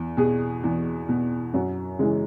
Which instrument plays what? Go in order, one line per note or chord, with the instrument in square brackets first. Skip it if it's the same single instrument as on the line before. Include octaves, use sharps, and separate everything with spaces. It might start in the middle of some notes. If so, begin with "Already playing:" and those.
Already playing: [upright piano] E2
B2 G#4
E2
B2
F#2 F#4
C#3 E3 G#3